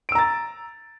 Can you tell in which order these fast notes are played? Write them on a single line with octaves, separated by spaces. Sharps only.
D7 E6 A#5 A6